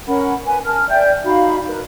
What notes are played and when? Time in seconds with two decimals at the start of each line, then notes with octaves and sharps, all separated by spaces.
0.07 C#4 A#4 F#5 B5
0.46 B4 G#5
0.66 A#4 A5 F6
0.89 D5 E5 G5 G6
1.25 D#4 F#4 F5 B5
1.67 A#4 B4